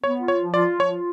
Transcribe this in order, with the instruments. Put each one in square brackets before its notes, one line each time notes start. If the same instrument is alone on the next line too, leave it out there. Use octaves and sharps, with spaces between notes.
[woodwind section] B3 [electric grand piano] C#5
[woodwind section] F4
[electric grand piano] C#5
[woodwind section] F3
[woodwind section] F4 [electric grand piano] D5
[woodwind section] F3
[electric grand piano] C#5
[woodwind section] F4